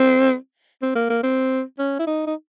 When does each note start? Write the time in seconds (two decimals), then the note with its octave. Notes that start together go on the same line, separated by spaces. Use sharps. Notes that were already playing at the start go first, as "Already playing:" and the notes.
Already playing: C4
0.82 C4
0.95 A#3
1.10 A#3
1.23 C4
1.79 C#4
1.99 E4
2.07 D#4
2.27 D#4